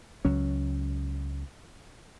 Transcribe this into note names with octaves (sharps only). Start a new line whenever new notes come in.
C#2 F#3 C#4